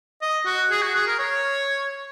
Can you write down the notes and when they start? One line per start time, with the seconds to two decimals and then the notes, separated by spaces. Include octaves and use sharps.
0.22 D#5
0.46 F#4
0.71 G#4
0.82 F#4
0.95 G#4
1.07 A#4
1.19 C#5